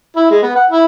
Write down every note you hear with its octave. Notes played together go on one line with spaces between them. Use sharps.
E4
G#3
B3
F#5
E4